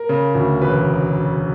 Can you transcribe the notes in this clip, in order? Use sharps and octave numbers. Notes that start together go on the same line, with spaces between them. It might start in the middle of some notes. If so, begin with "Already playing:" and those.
Already playing: A#4
C#3
D2
E1 B4